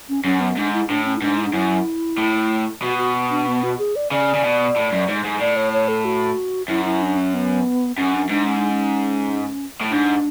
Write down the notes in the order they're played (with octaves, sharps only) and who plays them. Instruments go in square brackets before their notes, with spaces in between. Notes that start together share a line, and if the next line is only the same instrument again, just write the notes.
[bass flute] C#4
[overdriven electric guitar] F#2 [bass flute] C#4
[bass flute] B3
[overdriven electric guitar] G#2 [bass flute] D4
[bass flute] E4
[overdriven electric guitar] A2 [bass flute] D4
[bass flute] C#4
E4
[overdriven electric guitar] G#2 [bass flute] D4
[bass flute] E4
D4
[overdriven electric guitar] F#2 [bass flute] E4
[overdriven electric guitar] A2
[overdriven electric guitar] B2 [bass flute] F#4
[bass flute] F#4
D4
B3
F#4
G#4
D5
[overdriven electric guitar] C#3 [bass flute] D5
[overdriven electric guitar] C#3
B2
A2
F#2
G#2
G#2
[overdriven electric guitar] A2 [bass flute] D5
[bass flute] C#5
C#5
A4
F#4
[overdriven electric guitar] F#2 [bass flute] E4
[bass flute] E4
D4
C#4
B3
[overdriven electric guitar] F#2 [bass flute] C#4
[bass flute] D4
[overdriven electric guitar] G#2 [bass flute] D4
[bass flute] C#4
D4
C#4
[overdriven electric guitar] A2
[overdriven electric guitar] G#2 [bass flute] D4